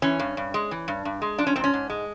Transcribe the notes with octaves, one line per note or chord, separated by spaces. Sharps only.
E3 C#4
G2
G2
G#3
E3
G2
G2
G#3
F3 D4
C#4
G#2 C4
C#4
G#2
G#3